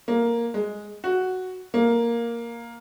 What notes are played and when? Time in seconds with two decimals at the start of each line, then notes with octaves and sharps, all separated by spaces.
0.08 A#3
0.54 G#3
1.04 F#4
1.74 A#3